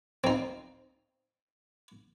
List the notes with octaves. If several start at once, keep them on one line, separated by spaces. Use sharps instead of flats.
C4 D#4